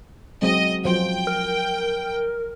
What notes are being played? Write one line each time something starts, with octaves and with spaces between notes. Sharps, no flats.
F#3 G#3 C4 D#5
F3 F#3 C5 G5
A#4